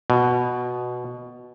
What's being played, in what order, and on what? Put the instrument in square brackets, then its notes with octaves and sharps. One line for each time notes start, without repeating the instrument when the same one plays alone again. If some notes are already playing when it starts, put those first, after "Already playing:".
[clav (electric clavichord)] B2